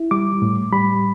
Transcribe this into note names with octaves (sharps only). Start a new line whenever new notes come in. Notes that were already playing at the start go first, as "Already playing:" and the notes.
Already playing: E4
G3 D6
A2
G3 B5